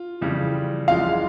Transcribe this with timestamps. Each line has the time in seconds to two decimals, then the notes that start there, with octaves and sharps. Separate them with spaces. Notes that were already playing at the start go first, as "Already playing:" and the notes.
Already playing: F4
0.21 F2 C#3 E3 G3
0.87 F#1 F2 C#3 E3 G#3 F4 F5